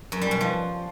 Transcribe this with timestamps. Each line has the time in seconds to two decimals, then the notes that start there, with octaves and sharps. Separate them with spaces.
0.12 F#2
0.22 G3
0.31 B2
0.41 F3